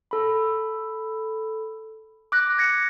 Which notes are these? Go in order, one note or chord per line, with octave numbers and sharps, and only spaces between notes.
A4 B5
D6 F#6 A#6
G#6 A#6 C#7